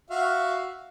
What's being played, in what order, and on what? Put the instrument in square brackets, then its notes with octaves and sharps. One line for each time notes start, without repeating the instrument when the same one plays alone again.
[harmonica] F#4 E5 F5